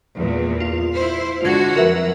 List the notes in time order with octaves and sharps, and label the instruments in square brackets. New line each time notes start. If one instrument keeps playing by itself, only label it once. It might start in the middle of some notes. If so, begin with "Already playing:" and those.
[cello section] E2 A#2
[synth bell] F4
[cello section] E4 C5
[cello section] D3 G#3 F#4 [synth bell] F4 G#6
[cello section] F2 F#3 [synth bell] A#4 B4 E5